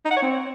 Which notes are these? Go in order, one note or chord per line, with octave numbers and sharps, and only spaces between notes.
D#4
F#5
C#5
C4